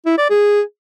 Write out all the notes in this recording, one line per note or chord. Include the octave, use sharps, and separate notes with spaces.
E4
D5
G#4